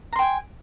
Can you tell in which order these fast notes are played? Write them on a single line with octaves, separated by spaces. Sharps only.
A#5 C6 G5 G#5